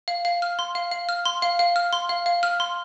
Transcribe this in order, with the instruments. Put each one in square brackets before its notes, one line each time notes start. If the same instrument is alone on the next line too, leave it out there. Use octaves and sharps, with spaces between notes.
[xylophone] F5
F5
F6
C6
F5
F5
F6
C6
F5
F5
F6
C6
F5
F5
F6
C6